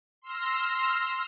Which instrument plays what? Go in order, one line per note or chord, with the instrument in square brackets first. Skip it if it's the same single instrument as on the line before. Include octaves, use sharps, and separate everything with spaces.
[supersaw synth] C6 E6 F6 A#6